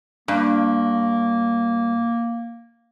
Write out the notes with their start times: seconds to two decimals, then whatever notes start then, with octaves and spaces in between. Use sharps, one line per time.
0.28 G2 A#3